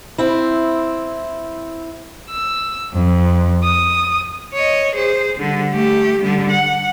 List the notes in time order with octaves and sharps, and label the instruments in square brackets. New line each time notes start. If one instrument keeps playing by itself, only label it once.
[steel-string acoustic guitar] C4 E4
[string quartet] E6
F2
D#6
[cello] C#5 D#5
G#4 C5
D3 G3
A3 G4
D3 G3
F#5